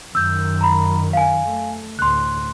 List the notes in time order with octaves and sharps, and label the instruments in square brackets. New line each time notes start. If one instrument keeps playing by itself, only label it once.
[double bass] F#2 D#3 [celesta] E6 G6
[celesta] A#5 B5
F5 G#5
[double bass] A3
[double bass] D2 A2 [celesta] C6 F#6